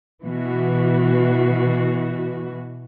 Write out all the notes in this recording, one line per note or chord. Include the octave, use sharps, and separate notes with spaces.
B2 E3 F#4